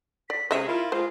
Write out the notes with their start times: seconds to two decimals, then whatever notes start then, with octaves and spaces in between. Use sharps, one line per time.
0.30 D5 B6
0.51 C3 G#3 C#4 C5 D#5 E5
0.67 E4 F4 A#4
0.92 G#3 F4 C5